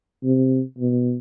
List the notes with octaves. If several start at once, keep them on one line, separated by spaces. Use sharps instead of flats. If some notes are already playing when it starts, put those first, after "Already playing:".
C3
B2